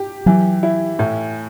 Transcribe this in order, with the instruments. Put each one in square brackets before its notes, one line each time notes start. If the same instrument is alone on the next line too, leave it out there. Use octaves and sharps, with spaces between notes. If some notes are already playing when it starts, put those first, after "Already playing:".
Already playing: [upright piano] G4
[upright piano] E3 [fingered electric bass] F#3
[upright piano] E4
A2